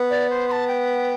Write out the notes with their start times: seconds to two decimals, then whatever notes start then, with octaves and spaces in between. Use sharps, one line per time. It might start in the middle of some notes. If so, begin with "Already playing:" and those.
Already playing: B3
0.10 D5
0.29 C5
0.48 C6
0.51 A5
0.67 G5